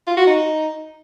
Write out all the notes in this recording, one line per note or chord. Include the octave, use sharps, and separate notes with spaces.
F4
F#4
D#4